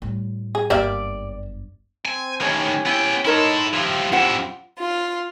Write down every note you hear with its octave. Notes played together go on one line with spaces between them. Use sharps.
A2 G3
G#4
G1 F#2 G3 A#3 D5 E5
C4 G#5
A2 D#3 C#4 G4 C#5 G#5
B3 E4 G5
D#4 E4 A4 A#4 C#5 D#5 C6
F3 E4 G4 F5 C6
F2 E4 F4 C5 F#5
F4